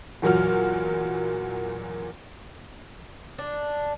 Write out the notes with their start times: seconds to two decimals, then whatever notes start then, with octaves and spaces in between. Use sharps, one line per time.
0.22 E2 A#2 F#3 F#4 F6
3.38 D4